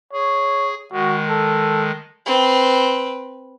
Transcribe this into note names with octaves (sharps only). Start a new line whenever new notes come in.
G#4 C#5
D#3 G#3 F#4
A4
C4 B4